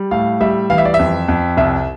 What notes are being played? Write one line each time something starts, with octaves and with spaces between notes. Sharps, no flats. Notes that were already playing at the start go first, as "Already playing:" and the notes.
Already playing: G3
A2 F5
G3 E5
E3 F5
E5
D5
E5
F2
F2
C2 E5